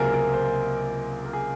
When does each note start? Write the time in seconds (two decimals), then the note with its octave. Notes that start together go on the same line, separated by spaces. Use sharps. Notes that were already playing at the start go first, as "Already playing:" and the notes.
Already playing: C#2 C3 F#3 A#3 G#4 A#4
0.14 A#4
0.34 C5
1.25 A#4
1.33 G#4